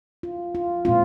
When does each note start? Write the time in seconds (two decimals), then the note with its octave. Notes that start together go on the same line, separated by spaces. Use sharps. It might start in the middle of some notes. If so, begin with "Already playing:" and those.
0.23 F4
0.55 F4
0.85 A#2 G#3 C4 F4